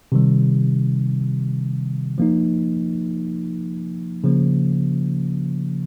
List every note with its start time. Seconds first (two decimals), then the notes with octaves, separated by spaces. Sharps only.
0.12 C3 D#3 G3
2.18 F3 A#3 D#4
4.24 C#3 F3 A#3